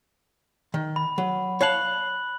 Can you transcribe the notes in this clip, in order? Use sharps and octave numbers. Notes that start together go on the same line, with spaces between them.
D#3
B5
F#3
C#5 F5 A5 B5 F#6 F#7